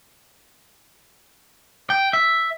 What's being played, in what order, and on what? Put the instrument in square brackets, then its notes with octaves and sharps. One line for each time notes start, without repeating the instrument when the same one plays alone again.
[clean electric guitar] G5
E5